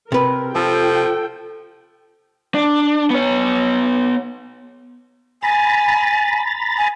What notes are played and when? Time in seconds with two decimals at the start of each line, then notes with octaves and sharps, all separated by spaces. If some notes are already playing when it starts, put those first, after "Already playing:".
0.12 C3 A#4 B4
0.55 F3 F4 A4 G5
2.55 D4
3.10 B3 C#5
5.43 G#5 A#5 B5 A6
6.78 G#5